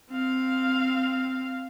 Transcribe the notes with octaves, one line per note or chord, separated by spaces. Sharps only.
C4 F5